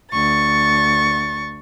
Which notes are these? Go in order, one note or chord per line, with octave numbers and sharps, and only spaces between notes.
D2 C#6 A6